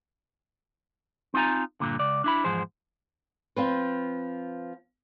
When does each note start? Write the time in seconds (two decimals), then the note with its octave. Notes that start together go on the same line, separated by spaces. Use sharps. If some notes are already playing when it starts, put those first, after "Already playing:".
1.34 C4 D#4 F4 G#5 A#5
1.80 G2 A#2 D3
1.99 C#2 D5
2.24 D4 E4 B5
2.44 E2 G#2 F3 G#4 C5
3.56 F3 C4 B4